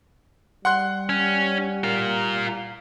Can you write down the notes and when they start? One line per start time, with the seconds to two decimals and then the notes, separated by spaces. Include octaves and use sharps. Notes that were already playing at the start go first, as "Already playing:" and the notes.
0.65 G3 F#5 C6 F#6
1.09 C#4
1.84 F4 A#4